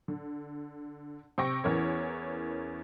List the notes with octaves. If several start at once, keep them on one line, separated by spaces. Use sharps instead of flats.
D3
C3 G5 C#6 A#6
E2 E3 C#4 A#4 C#5